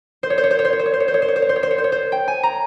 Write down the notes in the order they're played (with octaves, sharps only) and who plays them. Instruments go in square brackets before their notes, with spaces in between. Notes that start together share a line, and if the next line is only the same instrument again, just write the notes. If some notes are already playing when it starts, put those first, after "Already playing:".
[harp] C5
C#5
C5
C#5
C5
C#5
C5
C#5
C5
C#5
C5
C#5
C5
C#5
C5
C#5
C5
C#5
C5
C#5
C5
C#5
C5
C#5
C5
G5
G#5
A#5